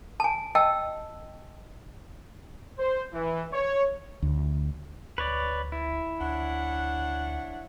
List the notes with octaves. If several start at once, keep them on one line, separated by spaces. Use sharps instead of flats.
G#5 A5
D#5 G5 A5 E6
C5
E3
C#5
D2
D2 B4 C#5 D5
E4
D2 D4 C#5 F#5